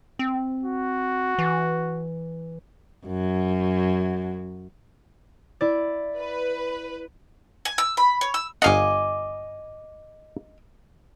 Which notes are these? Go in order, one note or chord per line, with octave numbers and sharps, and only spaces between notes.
C4
F#4
E3
F#2 F#3
E4 D5
B4
G#5
E6
B5
C#5
E6
G1 D#5 F5 F#5 G#5 D6